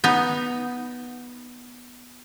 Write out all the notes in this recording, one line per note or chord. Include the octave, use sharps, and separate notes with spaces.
B3 D#4